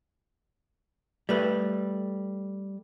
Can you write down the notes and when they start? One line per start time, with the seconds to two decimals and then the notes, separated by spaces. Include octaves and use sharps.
1.29 G3 A3 B4